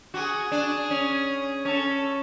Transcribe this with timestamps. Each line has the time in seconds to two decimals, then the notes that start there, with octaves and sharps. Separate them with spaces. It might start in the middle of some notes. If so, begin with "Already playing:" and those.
0.14 F#4 G#4
0.52 D4
0.91 C#4
1.65 C#4 A4